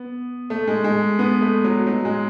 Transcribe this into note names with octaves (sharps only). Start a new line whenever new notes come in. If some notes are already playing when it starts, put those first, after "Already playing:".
Already playing: B3
A3
G#3
G#3
B3
A3
F#3
F#3
G#3